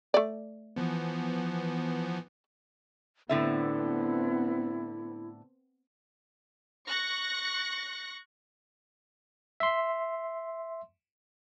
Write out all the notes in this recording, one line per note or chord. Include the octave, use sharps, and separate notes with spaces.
A3 D5
E3 F3 B3
A2 D3 B3 C4 E4 E5
C#6 F#6 A#6 C#7
E5 C6